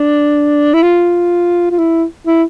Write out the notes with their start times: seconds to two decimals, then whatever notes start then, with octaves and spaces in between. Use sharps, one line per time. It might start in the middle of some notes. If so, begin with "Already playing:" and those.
Already playing: D4
0.74 E4
0.83 F4
1.71 F4
1.78 E4
2.27 E4